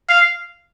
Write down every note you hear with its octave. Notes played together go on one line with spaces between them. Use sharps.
F5